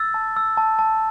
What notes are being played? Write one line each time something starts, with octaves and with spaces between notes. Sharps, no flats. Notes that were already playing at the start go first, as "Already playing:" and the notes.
Already playing: E6 A6
A5
E6
A5
A5